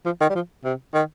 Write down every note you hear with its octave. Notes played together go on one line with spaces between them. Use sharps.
F3
D#3
G3
F3
C3
D#3